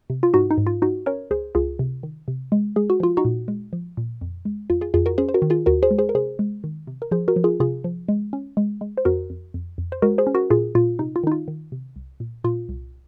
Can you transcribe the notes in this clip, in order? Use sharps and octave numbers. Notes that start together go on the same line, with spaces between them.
C3
F4
G#2 D#4 F#4
D#4
G#2
F4
G#2 D#4 F#4
C#4 A#4 C#5
C#2 G#4 C5
C#2 F4 G#4
C3
D#3
C3
G#3
G#3 G#4
F#4
F3 F4
D#4 F#4
A#2
G#3
F3
A#2
F2
G#3
F2 F4
F4 G#4
F2 F4 G#4
F#4 A#4
C#4 G#4 C5
C5
F#4 A#4
D#3
F4 G#4
D#2 F#4 A#4
G#4 C5
G#3
G#4 C5
A#4
C3 G#4 C5
G#3
D#3
C3
A#4
F3 G#4 C5
F#4 A#4
F3
F4 G#4
C3 F4 G#4
F3
G#3
C#4
G#3
G#3
C5
F2 F#4 A#4
F2
F2
F2
C5
G#3 F#4 A#4
G#4 C5
C#4
F#4 A#4
A#2 F4 G#4
A#2 F4
C3 D#4
F4
D#3 D#4
F4
D#3
C3
C2
A#2
A#2 F4
C2